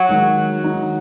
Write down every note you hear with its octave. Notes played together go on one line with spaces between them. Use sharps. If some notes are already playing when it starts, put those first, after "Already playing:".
Already playing: F#3 F#4
D#3 G#3 D#4
D#3 G#3 D#4